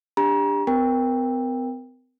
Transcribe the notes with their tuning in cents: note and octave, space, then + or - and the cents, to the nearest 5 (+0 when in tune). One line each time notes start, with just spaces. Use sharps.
D4 +0 G4 +25 A#5 +35
C4 -45 A#4 +5 G5 +20